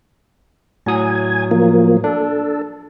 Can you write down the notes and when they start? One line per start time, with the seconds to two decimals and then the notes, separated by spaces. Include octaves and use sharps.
0.86 A2 F#3 G#5 D#6
1.51 F3 A#3
2.04 D4 A4